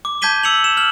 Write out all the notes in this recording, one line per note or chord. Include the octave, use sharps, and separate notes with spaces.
D6
A5 G6 G#6 B6 D#7 G7
E6 C#7 F7 F#7
E7
F6 F#7